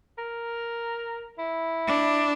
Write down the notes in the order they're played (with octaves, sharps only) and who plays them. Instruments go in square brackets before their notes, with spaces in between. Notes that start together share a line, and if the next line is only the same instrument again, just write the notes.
[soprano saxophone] A#4
E4
[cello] D4